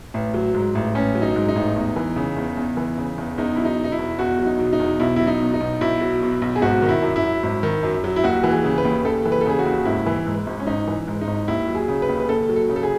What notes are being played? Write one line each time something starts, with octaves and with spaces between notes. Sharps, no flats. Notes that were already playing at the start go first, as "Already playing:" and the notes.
A1
F#3
G#2
A1
A1 C#4
F#3
D#4
G#2
D#4
A1
E2
E3
C#3
E2
E2
E3
C#3
E2
E2 D#4
F#3 E4
D#4
B2
D#4
E4
E2
E2 F#4
F#3
D#4
B2
D#4
E2
B1 E4
F#3 E4
D#4
B2
D#4
B1
B1 E4
F#3
B2
B1
G#4
G#1 F#4
D#3
E4
F#2
E4
F#3
G#1
D#3
F#2
F#3
E4
D#2 F#4
E3
G#4
C#3
B4
D#2
D#2 A4
E3
B4
A4
C#3 G#4
F#4
D#2
G#1 E4
E3
G#2
G#1
C#4
G#1 D#4
E3
G#2
D#4
G#1
D#2 E4
F#3
G#4
C#3
B4
D#2
B4
D#2 A4
F#3
A4
C#3
A4
G#4